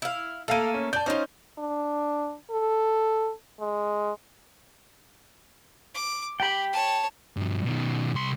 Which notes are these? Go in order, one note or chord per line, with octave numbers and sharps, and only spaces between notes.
E4 F5
A3 A#3 A4 F5 D#7
C#4
D5 A5 G6
C#4 D#4 F4 C5
D4
A4
G#3
D6
G4 G5 B5
C#5 A5
G2 F3
B2 D#3
C2 C6